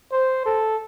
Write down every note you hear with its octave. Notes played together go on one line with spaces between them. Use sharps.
C5
A4